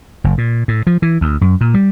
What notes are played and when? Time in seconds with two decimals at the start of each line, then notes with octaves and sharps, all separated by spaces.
0.24 F#1
0.38 A#2
0.68 A2
0.87 F3
1.02 E3
1.21 D2
1.41 F#2
1.61 A#2
1.74 G3